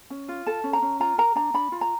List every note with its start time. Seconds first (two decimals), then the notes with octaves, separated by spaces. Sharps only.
0.10 C#4
0.29 F4
0.46 A4 A5
0.64 C#4
0.73 A#5
0.82 C#4
1.00 F4 A#5
1.18 A#4 A#5
1.35 D4 A#5
1.54 D4 B5
1.72 F4
1.81 A#5